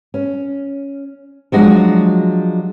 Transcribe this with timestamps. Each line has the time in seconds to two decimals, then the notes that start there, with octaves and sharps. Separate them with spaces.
0.14 C#4
1.52 F3 F#3 G#3 D4 F#4